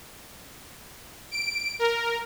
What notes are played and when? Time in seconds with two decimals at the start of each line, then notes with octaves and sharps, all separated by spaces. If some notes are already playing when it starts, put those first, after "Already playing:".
1.31 D7
1.79 A#4